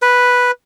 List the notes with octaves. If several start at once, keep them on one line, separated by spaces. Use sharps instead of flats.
B4